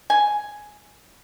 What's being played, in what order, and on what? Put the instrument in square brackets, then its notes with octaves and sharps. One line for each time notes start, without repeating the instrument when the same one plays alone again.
[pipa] G#5